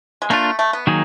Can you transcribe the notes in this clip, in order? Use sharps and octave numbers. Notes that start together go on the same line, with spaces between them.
G#3
A3 A#3 D4 F4
A3
B3
D#3 F#3 A#3 D#4 G#4